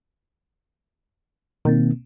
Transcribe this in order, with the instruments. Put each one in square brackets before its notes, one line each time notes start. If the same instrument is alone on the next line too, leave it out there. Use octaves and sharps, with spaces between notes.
[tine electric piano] B2 A#3 C4 [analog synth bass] D#3